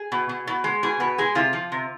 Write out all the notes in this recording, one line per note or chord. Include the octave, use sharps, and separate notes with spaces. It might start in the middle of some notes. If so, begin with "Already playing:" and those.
Already playing: G#4
B2
B2
B2
G#3
B2 G#4
B2 B4
G#3 G#4
C3 F4
F3
C3